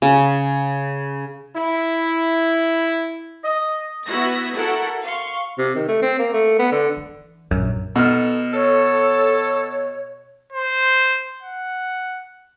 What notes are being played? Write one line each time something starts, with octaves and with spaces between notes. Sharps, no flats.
C#3
E4
D#5
B3 E4 F#4 A#6
E4 F#4 A4 A#4 F#5
F5 C6 C#6
C3
D#3
A3
C4
A#3
A3
B3
D3
E3
A#1 F#2 D#3
B2 D#4 A4 F6
A4 C#5
C5
F#5